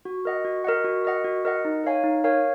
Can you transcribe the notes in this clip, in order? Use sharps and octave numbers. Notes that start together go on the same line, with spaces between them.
F#4
A#4 D#5 F#5
F#4
A#4 D#5 F#5
F#4
A#4 D#5 F#5
F#4
A#4 D#5 F#5
D#4
A#4 C#5 F5 G#5
D#4
A#4 C#5 F5 G#5